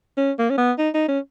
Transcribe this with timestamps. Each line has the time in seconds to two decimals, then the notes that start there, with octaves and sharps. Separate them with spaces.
0.17 C#4
0.38 A#3
0.50 C#4
0.58 B3
0.78 D#4
0.94 D#4
1.08 C#4